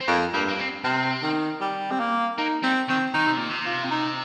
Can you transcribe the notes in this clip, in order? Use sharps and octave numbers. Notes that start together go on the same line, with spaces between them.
C4
F2 A#3
G2 A#3
A#3
C4
C3 C4
D#3
G3
C4
A#3
A#3 D#4
G3 C4
D#3 C4
D#3 D#4
C3
A#2
C3
F4
C4
D#4